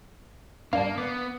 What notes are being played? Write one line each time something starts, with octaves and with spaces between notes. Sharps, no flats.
G2 G3 A#3 F5 A5
B3 D6